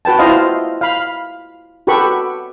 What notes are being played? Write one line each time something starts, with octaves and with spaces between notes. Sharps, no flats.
F#4 B4 G5 A5
E4 F4 C5 D#5 F5
F5 B5
F#4 G4 A4 B4 B5 C#6